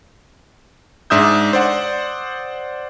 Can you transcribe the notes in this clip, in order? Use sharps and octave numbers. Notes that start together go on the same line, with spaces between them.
G#2 D4 E5 D#6 E6 G6
C5 D5 F#5